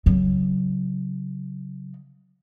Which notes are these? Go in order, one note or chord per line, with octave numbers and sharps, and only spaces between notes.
C#3 F#3